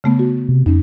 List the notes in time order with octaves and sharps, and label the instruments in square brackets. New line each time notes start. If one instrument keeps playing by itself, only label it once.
[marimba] C#3 A3 B3
F#4
[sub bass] C3
[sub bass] F2 [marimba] C#4 D#4